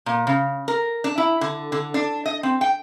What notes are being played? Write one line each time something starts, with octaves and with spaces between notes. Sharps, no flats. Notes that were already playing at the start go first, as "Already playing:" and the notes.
A#2
C#3
A#4
D4
E4
D3
D3
D4
D#5
C4
G5